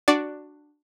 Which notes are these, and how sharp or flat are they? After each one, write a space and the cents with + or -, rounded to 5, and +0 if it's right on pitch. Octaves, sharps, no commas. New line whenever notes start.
D4 +10 F#4 +0 D5 +0